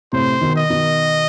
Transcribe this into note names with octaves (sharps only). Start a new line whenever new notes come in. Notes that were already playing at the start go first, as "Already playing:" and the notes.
A2 C3 C5
B2 D#3
D#5
B2 D#3